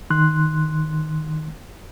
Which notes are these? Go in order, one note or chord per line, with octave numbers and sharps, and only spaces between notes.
D#3 C6 F#6